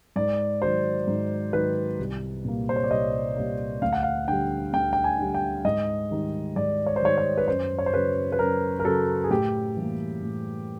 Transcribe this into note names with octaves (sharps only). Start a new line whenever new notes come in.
G#2 D5
D#3 F#3 C5
G#2
D#3 F#3 B4
C2
A#2 G3 A#3
C5
C#5
D5
C2 D#5
A#2 G3 A#3
D2 F5
F#5
F5
D3 G3 G5
D2 G5
G5
G#5
D3 G3
G5
G#2 D#5
D#3 G3
G#2 D5
C#5
C5
D#3 G3 C#5
C#5
B4
F#2 C5
C#5
C5
C#3 F#3 B4
B4
F#2 A#4
A#4
C#3 F#3 A4
G#4
A2 G4
E3 G3 A#3
A2